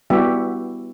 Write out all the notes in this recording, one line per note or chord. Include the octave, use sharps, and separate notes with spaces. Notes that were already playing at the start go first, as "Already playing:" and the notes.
G3 B3 E4 F#4 G4 E5